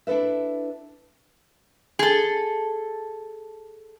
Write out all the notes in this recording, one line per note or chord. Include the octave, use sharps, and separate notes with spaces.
D4 E4 A4 B4 E5
G#4 A4